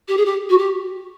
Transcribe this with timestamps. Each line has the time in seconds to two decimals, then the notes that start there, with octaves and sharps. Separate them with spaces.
0.08 G4
0.17 G#4
0.25 G4
0.50 F#4
0.58 G4